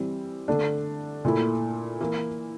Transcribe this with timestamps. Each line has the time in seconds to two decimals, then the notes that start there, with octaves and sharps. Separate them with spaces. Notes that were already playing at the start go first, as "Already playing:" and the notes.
Already playing: E3 G3 C4
0.48 D3 A3 D4
1.25 A#2 A3 E4
2.00 E3 A#3 E4